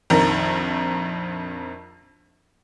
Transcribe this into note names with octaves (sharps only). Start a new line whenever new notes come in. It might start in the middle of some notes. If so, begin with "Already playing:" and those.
A#1 F2 D#3 A#4